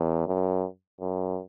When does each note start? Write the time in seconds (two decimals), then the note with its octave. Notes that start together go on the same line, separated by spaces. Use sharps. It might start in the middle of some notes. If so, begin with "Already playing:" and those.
Already playing: E2
0.27 F#2
1.01 F#2